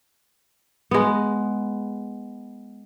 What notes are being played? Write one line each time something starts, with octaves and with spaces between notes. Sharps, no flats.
G#3 B3